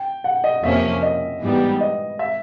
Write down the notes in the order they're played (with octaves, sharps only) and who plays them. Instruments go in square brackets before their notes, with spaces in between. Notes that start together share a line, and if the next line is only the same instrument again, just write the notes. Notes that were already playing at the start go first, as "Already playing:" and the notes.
Already playing: [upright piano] G5
F#5
D#5
[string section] F2 C3 F3 A#3 C#4 [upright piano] E5
[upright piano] D#5
[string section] G#2 E3 G3 B3
[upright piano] D#5
E5